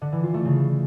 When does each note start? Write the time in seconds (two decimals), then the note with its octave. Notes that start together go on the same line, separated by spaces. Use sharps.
0.01 D3
0.12 E3
0.23 F4
0.34 A3
0.45 C#3